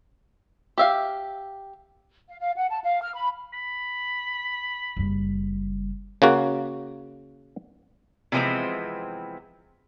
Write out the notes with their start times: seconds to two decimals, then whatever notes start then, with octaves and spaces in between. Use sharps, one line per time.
0.78 G4 E5 F5
2.28 F5
2.41 F5
2.57 F#5
2.70 A5
2.83 F5
3.02 F6
3.14 B5
3.54 B5
4.97 F#1 G3
6.22 C#3 A#3 F#4
8.32 C3 E3 F3 G#3 B3 C4